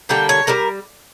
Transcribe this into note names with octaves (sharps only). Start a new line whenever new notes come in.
D3 G3 A#3 G5
C#5
D3 G3 A#4